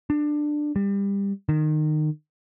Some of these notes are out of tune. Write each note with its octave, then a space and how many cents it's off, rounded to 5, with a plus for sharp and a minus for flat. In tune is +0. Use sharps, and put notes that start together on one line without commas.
D4 +15
G3 +25
D#3 -25